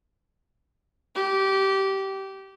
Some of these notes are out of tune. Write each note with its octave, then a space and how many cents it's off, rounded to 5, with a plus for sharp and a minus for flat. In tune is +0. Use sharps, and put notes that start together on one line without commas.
G4 -20